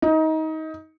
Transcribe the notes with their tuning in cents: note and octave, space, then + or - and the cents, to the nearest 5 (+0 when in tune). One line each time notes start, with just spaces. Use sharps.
D#4 +25